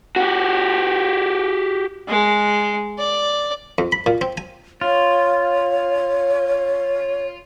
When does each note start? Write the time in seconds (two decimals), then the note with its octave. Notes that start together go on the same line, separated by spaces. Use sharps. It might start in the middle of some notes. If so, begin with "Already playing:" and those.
0.16 F#4 G4
2.09 G#3
2.98 D5
3.78 F2
3.92 B5
4.06 A#2
4.21 C4
4.37 G#5
4.81 F4 C#5